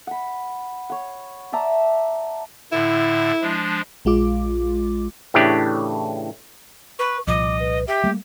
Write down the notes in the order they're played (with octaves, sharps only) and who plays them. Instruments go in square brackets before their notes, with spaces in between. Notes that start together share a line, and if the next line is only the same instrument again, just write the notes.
[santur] F#5 B5
C#5 F#5
D5 E5 A5 A#5
[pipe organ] A2 D3 [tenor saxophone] E4
[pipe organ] F3 G#3 D4
[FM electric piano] A#1 G#3 F4 D6
[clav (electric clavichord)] A2 C#3 E3 A3 D4 G4
[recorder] B4 [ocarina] C#6
[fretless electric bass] C2 A#2 F3 [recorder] D#5 [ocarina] D6
[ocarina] B4
[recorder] G4 [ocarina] E5
[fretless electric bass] G3 A3 A#3